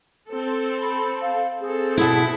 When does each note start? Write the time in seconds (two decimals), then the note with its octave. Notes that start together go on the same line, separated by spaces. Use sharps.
0.30 C4 A4
0.81 B5
1.22 F5
1.61 C4 G#4 A4
1.97 B2 E4